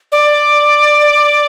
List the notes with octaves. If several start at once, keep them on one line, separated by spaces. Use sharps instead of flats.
D5